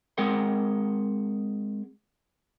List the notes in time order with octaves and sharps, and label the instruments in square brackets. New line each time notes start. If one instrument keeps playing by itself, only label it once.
[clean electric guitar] G#3 C4 G#4 A#4 F#5 G5